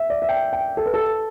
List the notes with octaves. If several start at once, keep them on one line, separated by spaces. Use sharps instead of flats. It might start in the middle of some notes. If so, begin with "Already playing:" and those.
Already playing: E5
D5
E5
G5
G5
A4
B4
A4